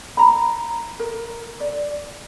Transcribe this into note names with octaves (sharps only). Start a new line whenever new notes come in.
A#5 B5
A#4
D5